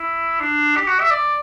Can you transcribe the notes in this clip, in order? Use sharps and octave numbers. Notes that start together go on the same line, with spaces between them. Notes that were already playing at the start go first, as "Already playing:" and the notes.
Already playing: E4
D4
G4
F#4
E5
D5